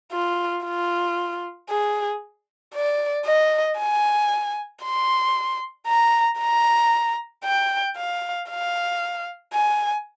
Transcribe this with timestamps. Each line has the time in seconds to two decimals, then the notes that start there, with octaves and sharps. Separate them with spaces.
0.12 F4
0.64 F4
1.70 G#4
2.74 D5
3.26 D#5
3.79 G#5
4.83 C6
5.87 A#5
6.39 A#5
7.44 G5
7.97 F5
8.50 F5
9.53 G#5